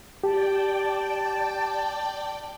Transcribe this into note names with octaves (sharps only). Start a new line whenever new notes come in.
G4 D5 G5 A5